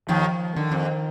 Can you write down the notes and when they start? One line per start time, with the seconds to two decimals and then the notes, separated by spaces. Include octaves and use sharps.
0.08 D#2 D#3 F3
0.56 D3 D#3
0.71 F2